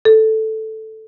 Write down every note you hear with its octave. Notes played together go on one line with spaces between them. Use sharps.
A4